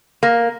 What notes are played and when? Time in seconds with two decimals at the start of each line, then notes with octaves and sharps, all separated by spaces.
0.23 A#3